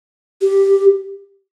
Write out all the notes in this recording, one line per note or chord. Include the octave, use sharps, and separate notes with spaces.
G4